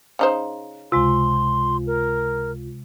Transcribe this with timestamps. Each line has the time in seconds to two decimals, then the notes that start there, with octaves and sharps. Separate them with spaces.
0.19 C#3 D#4 C5
0.92 C#2 C3 G#3 F4 C6
1.87 A#4